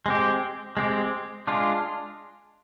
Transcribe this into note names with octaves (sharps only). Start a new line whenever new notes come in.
G#3 C4 G4
G#3 C4 G4
G#3 D4 F4